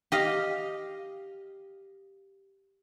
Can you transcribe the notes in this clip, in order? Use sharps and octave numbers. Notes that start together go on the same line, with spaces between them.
G4 D#5 F5